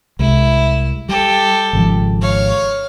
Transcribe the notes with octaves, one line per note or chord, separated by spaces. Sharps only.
C2 G#3 E4
G3 G4 A4
G#1 C#3 F3
C#5 F5